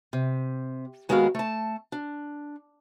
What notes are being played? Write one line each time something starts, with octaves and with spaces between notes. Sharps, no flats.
C3
D#2 G#3 B3 F#4 A#4 F5
A3 A5
D4